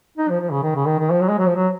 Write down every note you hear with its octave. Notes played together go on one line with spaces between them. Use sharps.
D#4
F3
F3
C#3
D#3
C#3
D#3
D#3
F3
F#3
G#3
F#3
F3
F#3